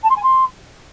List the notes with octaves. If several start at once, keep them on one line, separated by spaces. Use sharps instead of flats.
A5
C6
G#5
C6